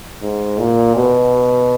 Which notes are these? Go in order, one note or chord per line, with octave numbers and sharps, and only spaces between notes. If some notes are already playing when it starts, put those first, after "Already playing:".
G#2
A#2
B2